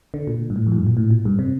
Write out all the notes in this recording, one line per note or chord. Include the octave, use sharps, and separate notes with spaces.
D3
A#2
G2
A2
F2
A2
G2
A#2
A2
A#2
G2
C3